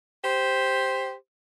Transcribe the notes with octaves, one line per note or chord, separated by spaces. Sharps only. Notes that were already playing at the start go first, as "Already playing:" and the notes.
G4 C5